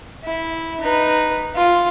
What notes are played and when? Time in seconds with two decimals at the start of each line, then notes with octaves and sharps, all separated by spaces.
0.25 E4
0.81 D#4 B4
1.56 F4